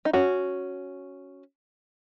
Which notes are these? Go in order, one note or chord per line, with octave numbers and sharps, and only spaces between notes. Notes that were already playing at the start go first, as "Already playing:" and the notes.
D#4
C#4 F#4